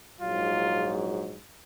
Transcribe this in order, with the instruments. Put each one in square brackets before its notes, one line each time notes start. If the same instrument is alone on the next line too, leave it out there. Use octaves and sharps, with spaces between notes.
[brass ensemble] A#1 G#2 F#3 F4